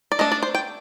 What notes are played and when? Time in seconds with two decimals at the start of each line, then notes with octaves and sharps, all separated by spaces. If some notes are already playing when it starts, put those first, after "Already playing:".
0.12 D5
0.19 A3 D4 D#5
0.32 D5
0.43 C5
0.55 G5